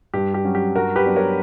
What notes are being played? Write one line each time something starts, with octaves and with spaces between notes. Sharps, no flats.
G2 G4
G4
F#3 C#4
G4
G2 F#4 A#4
G4 B4
F#3 B3 D4
A#4 C#5